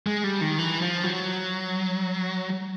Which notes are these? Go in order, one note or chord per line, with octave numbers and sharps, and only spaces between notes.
G#3
G3
D#3
E3
F3
F#3